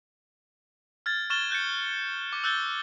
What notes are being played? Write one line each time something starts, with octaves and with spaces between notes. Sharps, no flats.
F6 G#6 A6
C#6 F6 F#6 A6 E7 G7
F#6 G6 A6 C#7
D6
E6 F#6 G6 A6 G7